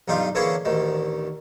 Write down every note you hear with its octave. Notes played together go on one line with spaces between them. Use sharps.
B1 G2 D#4 F4 G4
D3 E3 A#3 C#4 G#4 C#5
A1 D2 D#3